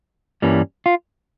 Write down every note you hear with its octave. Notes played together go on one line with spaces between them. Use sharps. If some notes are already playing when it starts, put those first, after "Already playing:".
G2 E3 G3 A#3 C#4
F4